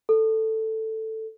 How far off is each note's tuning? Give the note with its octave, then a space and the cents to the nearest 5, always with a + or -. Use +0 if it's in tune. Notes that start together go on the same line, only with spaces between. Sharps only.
A4 +5